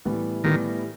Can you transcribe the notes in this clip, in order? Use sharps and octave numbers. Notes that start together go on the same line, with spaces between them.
A2 E3 G3 B3
A2 D#3 E3 G3 B3